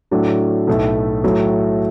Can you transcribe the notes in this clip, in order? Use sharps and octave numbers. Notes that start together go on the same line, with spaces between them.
A2 F#3 D4 F#4 A4
B1 A2 A3 E4
A2 F#3 A3